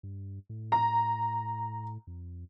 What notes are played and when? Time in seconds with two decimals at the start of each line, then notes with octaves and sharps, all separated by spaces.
0.03 G2
0.49 A2
0.72 A#5
2.07 F2